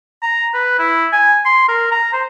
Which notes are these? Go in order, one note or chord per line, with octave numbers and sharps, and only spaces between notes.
A#5
B4
E4
G#5
C6
A#4
A#5
C5